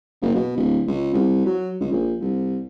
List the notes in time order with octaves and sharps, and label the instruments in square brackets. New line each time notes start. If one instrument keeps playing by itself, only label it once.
[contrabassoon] F#1
B2
D1
C#2
C2
F#3
C#2
A#1
C2